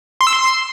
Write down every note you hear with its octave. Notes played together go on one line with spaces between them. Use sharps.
C6
E6
C6